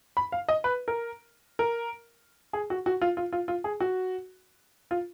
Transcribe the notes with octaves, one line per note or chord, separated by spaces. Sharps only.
B5
F5
D#5
B4
A#4
A#4
G#4
F#4
F#4
F4
F4
F4
F4
G#4
F#4
F4